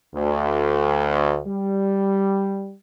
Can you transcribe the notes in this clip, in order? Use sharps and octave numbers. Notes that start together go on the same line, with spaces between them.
D2
G3